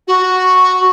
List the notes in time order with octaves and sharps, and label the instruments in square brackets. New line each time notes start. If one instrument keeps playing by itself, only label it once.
[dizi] F#4